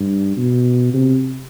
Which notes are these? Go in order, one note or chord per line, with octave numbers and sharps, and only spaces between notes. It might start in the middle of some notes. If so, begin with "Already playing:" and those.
Already playing: G2
B2
C3